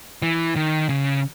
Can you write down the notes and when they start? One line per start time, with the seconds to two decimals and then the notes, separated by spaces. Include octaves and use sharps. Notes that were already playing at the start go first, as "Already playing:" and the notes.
0.22 E3
0.56 D#3
0.89 C#3